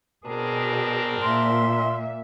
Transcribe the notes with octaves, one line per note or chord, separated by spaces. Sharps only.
B2 C4 D4 G#4 A#4
A#2 E5 C6